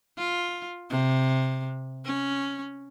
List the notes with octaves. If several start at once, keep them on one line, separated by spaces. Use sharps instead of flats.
F4
C3
C#4